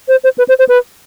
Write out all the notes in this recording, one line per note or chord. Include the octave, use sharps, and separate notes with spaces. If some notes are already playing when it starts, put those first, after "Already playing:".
C5
C5
B4
C5
C5
B4